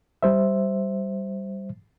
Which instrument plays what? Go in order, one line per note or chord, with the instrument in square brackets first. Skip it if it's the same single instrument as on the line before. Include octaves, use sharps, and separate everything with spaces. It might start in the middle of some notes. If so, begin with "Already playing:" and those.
[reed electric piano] G3 C5 E5